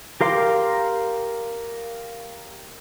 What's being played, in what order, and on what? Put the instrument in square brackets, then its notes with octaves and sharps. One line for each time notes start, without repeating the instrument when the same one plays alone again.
[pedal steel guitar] G4 A#4 F5 C6 D6